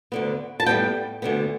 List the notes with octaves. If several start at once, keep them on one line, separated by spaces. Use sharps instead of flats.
D2 D3 B3
A5
A2 G3 B3 G5
D2 D3 B3